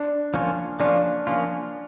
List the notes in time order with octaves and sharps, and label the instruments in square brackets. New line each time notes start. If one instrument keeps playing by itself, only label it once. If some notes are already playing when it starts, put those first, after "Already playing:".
Already playing: [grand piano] D4
[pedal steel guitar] F3 A#3 C#4 F4
[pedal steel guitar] F3 A#3 C#4 F4 [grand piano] D4
[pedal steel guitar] F3 A#3 C#4 F4